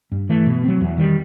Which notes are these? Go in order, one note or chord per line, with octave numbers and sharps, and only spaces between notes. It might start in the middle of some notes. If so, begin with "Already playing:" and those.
G2
E3 A3
B2
F#3 C4
E2
D#3 G3